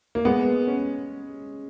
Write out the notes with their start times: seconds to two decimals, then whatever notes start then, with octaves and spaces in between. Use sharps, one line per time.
0.15 A#3
0.25 G#3 B3
0.67 C#4